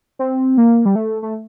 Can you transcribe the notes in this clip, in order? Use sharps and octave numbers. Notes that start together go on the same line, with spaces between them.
C4
A#3
G3
A3
A3